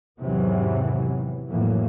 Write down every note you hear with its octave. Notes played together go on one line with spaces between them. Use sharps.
E2 G#2 C3 D#3 E3 F#3
F2 A2 E3 F#3 A#3